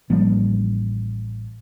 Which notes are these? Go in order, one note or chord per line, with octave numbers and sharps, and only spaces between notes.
A1 F3 G3 A#3